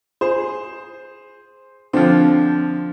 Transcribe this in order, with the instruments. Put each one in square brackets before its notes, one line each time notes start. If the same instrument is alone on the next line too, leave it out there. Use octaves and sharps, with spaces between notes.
[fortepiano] G#4 [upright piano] C5
[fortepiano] D3 F3 [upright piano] C4